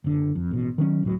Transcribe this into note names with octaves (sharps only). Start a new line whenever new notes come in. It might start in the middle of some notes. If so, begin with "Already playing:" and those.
F#1 D3
F2
A1 B2
D#3 F#3 C#4
C#2 A2 F#3